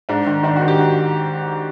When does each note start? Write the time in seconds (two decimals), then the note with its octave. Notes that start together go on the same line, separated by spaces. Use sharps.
0.09 G#2 D4
0.27 D#3
0.43 D#3 D4
0.56 F#4
0.61 D#3
0.68 G4
0.78 D#3 F#4